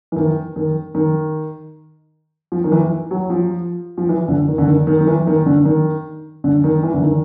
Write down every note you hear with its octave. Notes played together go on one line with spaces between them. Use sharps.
E3
D#3
D#3
D#3
F3
D#3
E3
F#3
F3
F3
E3
D3
D#3
D3
D#3
D#3
D#3
E3
D#3
D3
D#3
D3
D#3
E3
D3
D#3